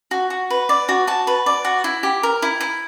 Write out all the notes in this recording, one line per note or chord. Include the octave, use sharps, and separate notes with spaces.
F#4
F#4
B4
D5
F#4
F#4 A5
B4
D5
F#4
E4
G4
A#4
E4
E4